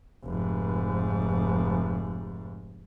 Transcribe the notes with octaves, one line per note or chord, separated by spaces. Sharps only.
F1 G#2